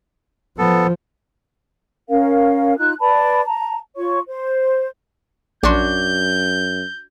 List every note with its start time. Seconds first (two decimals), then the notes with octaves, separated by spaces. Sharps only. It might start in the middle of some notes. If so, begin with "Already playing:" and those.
0.58 F3 B3 A4
2.09 C#4 A#4 F5
2.78 D#4 F4 F#6
3.00 B4 D5 A5 B5
3.45 A5 A#5
3.96 F4 C#5 C#6
4.27 C5
5.63 A#1 F#2 D4 F#4 C6 G6